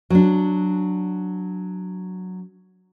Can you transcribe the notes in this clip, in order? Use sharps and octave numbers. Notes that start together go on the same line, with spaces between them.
F#3 D4